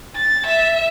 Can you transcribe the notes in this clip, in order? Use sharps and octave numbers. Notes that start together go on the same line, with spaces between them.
A6
E5